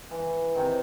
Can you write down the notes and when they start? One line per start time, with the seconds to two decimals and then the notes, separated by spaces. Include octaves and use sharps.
0.11 E3
0.55 C3 D#3